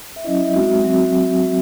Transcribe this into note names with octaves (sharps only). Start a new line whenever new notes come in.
E5
F#3 C#4 E4 D#5
E5
G#3 C4 D#4 F#4
F#3 C4 F#4